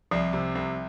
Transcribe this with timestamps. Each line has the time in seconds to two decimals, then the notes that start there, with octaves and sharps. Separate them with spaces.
0.11 C2 F3
0.33 C3
0.55 C2